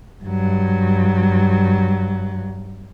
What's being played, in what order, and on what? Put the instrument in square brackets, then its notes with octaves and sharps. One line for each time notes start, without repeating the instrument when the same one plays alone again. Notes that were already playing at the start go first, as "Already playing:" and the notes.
[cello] G2 F#3